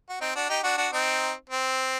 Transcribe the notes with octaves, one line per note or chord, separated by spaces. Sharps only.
F#4
C4 D#4
D4 F#4
D#4 G4
D4 F#4
D4 F#4
C4 D#4
C4